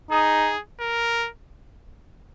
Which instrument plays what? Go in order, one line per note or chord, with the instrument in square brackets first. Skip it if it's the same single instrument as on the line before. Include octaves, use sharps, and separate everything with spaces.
[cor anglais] D#4 [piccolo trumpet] G#4
[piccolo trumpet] A#4